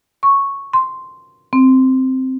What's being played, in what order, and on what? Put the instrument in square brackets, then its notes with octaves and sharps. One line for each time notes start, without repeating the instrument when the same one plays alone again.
[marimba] C#6
C6
C4